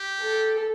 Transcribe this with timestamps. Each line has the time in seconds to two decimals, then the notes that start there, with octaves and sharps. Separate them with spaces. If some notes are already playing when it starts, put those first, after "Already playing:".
Already playing: G4
0.19 A4